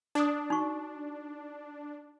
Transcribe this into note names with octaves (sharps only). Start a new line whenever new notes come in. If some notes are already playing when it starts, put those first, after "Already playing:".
D4 D5 D#6
D#4 F#4 C#6